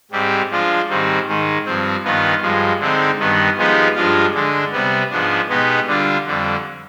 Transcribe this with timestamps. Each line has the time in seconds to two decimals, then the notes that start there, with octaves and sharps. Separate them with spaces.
0.11 G#2 G3 C4 G4
0.51 F3 G#3 D4 F4
0.89 G#2 D#3 G3 C4
1.28 G#2 D#3 G#3
1.66 G2 F3 C4
2.03 G2 D#3 B3 F4
2.42 G2 F3 G#3
2.80 D3 G#3 C4 D#4
3.19 G2 D#3 B3
3.58 F3 G#3 B3 D#4 G4
3.95 G2 F3 G#3 D4 F4
4.34 D3 G#3 D4
4.72 C3 G3 B3
5.10 G#2 F3 B3 D4
5.49 B2 G#3 B3 D#4 G4
5.87 D3 G3 D4 F4
6.26 F2 D3 G3